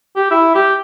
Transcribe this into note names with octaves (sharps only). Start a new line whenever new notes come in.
G4
E4
G4